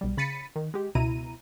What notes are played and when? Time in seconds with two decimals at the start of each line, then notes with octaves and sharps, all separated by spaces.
0.01 B1 G3
0.17 C#3 B5 A6 B6 C#7 D#7
0.56 D#3
0.74 G#3 G4
0.95 C#2 B2 E4 A#5 D#7